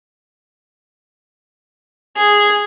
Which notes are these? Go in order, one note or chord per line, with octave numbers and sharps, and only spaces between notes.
G#4